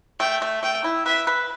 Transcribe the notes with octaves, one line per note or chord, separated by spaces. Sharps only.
A3 G5
A3
A3 G5
E4
B4 E5
B4